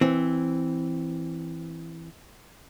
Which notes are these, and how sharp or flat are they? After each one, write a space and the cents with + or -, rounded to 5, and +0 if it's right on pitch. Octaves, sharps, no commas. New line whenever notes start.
E3 +0 C4 +0